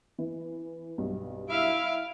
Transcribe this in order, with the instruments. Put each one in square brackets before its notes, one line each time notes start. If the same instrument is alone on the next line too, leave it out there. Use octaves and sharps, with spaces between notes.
[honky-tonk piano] E3
B1 G2
[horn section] E4 E5 [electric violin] F5 D7